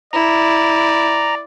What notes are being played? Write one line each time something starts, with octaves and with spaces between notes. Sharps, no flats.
E4 D5 A#5